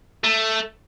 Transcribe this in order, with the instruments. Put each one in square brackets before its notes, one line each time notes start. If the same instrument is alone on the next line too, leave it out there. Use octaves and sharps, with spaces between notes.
[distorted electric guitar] A3